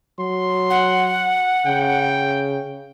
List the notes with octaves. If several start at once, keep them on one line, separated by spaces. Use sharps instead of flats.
F#3 C6
F#5
C#3 G5